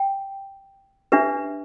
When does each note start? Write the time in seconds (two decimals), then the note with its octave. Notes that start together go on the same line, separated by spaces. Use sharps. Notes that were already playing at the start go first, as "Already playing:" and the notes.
Already playing: G5
1.12 D4 G4 B4 E5